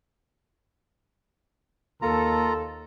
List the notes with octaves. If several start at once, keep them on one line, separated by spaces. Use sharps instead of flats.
D#2 A#3 F4 A4 A#5